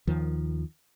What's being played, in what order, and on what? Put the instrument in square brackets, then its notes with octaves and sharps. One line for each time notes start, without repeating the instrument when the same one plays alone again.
[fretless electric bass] D#2 D#3 F3